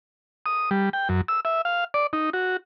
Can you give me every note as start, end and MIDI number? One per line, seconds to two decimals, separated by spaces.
0.46 0.70 87
0.71 0.89 55
0.93 1.08 79
1.09 1.21 42
1.28 1.40 88
1.45 1.62 76
1.65 1.84 77
1.94 2.07 74
2.13 2.30 63
2.33 2.57 66